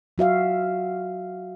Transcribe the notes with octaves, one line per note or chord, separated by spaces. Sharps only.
F#3 F#4 E5 F5